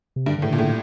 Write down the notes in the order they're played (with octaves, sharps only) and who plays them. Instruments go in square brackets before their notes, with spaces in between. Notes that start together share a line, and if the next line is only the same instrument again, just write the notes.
[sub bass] C3
[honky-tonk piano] G2 [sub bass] D3
[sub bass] D3
[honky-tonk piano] A2
[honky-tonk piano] A#2 [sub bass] D3
[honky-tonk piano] A2
[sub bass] D3